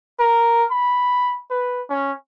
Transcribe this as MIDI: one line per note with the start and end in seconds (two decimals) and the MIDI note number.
0.19 0.65 70
0.71 1.39 83
1.50 1.82 71
1.90 2.12 61